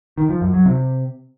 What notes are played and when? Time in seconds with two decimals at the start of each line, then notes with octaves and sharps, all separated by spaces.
0.18 D#3
0.30 F3
0.42 F#2
0.54 F#3
0.66 C3